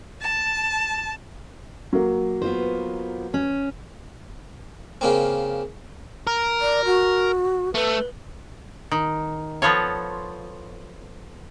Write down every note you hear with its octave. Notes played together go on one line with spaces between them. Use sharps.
A5
F#3 A#3
B3 F4 C5
C#4
C#3 A#3 C4
A#4
D5
F#4
A3 B4
D#3
F3 B3 F4 A4 C#5